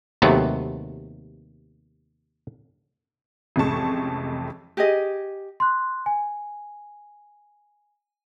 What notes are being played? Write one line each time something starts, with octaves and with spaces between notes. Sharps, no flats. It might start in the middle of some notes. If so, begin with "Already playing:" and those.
D#2 C3 F#3 A3 B3
A1 F2 C3 G#3 A5 C#6
G4 G#4 D#5
C6 F#6
G#5